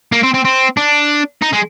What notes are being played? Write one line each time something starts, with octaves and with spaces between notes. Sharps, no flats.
A#3
C4
C4
C4
D4
D#4
G#3